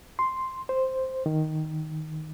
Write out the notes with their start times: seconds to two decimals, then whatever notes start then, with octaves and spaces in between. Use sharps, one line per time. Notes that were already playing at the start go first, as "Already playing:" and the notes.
0.19 C6
0.69 C5
1.26 D#3